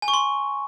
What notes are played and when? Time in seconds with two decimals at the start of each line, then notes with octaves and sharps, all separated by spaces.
0.02 G#5
0.08 C#6
0.14 C6